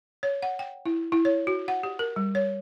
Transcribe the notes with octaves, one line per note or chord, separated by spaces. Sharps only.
C#5
F#5
G5
E4
E4
C#5
F#4
F#5
G4
A#4
G3
C#5